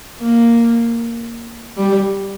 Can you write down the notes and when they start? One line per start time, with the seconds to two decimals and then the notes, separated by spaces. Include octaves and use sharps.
0.21 A#3
1.78 G3